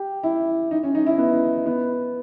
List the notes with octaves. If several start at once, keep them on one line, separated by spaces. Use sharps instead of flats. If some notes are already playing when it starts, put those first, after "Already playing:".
Already playing: G4
E4
D#4
C#4
D#4
E4
B3
B3